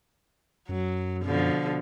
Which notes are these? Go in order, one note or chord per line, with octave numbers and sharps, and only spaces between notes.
F#2 F#3
B2 D3 F3